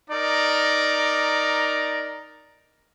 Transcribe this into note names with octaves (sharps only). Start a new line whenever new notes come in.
D#4 A#4 D5